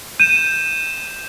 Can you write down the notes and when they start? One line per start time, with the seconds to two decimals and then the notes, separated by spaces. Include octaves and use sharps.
0.20 G6 D#7 E7